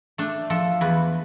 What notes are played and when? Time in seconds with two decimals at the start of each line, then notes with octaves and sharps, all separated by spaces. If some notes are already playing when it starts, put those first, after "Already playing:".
0.18 A3 D4
0.50 F3 A4
0.81 E2 B4